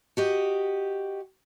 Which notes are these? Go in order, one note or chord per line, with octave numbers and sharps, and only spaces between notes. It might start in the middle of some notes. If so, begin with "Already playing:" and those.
F#4 G4 D#5